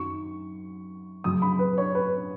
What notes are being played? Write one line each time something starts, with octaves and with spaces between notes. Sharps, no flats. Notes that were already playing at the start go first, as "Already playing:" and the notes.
Already playing: F#2 D#3 F#3 C#6
F#2 C#3 F#3 D#6
B5
B4
C#5
B4